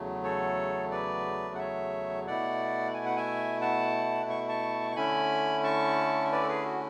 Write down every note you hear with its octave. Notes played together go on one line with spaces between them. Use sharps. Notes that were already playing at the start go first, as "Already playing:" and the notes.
Already playing: E2 C#3 F#3 A3
A4 C#5
B4 D5
F#5
C#5 E5
B2 A3 E4 D5 F#5
G#5
F#5
E5 G#5
F#5 A5
C#6
A5 C#6
C#6
D3 A3 C#4 E4 G#5 B5
A5 C#6
B4 D5
A4
G#4 B4
F#4